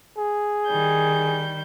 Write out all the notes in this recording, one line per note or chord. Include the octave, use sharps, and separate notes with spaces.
G#4
D#3 G3 G6